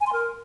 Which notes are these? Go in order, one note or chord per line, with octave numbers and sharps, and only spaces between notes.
G#5
C6
A#4